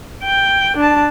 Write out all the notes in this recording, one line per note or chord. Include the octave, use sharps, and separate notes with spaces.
G5
D4 A5